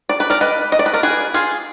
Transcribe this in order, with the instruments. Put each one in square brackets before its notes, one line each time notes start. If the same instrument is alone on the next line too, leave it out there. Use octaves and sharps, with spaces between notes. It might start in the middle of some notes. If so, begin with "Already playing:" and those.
[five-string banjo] D5
B4
A#4 D5
B4 D#5
D#5
D5
B4
A#4 D5
G#4 B4
F4 G#4